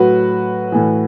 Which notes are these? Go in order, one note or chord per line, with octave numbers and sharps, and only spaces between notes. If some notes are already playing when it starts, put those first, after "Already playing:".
Already playing: A2 F#3 F#4 B4
A2 E3